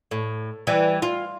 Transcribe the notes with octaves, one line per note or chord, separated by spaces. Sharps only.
A2
E3 G3
F4